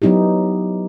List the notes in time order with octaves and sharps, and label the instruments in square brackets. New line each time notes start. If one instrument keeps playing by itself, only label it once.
[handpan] F#3 B3 D#4 E4 G4